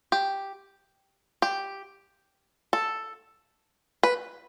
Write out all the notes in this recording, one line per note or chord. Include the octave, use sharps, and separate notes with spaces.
G4
G4
A4
B4